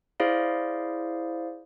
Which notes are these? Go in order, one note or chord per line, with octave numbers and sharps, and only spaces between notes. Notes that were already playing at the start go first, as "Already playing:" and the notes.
E4 G#4 C5 D5 F5